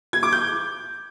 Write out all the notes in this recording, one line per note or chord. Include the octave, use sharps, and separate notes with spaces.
G#6
D6
G6